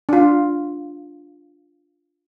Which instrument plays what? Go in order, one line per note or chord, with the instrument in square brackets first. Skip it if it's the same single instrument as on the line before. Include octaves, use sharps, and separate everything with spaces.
[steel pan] D4 F4